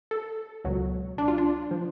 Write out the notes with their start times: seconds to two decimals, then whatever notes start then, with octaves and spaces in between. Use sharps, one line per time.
0.11 A4
0.65 C#2 B2 F#3
1.18 D4
1.28 F4
1.38 D4
1.71 F3